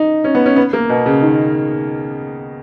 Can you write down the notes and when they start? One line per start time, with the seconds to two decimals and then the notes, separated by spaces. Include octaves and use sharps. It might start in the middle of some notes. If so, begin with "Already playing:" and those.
Already playing: D#4
0.24 C#4
0.35 B3
0.46 C#4
0.56 B3
0.73 A#3
0.90 B2
1.06 C#3
1.22 D#3